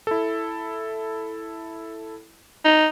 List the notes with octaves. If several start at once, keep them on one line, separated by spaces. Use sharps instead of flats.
E4 A4
D#4